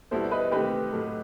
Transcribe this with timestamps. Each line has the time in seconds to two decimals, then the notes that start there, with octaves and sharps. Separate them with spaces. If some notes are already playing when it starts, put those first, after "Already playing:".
0.11 B2 G3 B3 E4 A4 C5
0.31 B4 D#5
0.51 C3 D#3 A3 C4 G4 B4
0.93 A2 F#3 A3